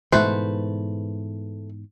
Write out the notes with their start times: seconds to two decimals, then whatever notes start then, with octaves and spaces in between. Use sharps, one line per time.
0.12 G#2 B2 E3 A3 B4 C5